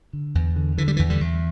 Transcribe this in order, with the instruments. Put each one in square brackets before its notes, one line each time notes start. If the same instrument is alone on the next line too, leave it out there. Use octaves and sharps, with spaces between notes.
[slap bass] D3
E2
D3
D3 E3
G3
E3
E2
D3 G3
E2